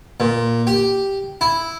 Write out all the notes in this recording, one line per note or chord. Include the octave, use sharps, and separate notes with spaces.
A#2
G4
E4